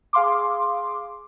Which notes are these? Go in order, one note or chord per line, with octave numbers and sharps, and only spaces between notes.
G#4 F5 C6 D6